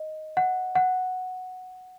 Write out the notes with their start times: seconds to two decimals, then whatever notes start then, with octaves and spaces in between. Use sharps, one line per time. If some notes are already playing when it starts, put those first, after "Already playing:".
Already playing: D#5
0.37 F#5
0.75 F#5